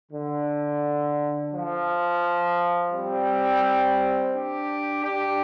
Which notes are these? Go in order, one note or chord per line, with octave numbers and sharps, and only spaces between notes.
D3
F3
G3 C4
D4 G4
D4 G4